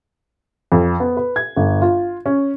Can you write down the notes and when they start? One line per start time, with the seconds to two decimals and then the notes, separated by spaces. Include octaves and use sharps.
0.72 F2
1.00 B3
1.17 B4
1.36 G#6
1.56 G1
1.82 F4
2.26 C#4